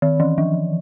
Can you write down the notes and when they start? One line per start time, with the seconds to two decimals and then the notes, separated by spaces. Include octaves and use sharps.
0.02 D#3
0.20 E3
0.38 F3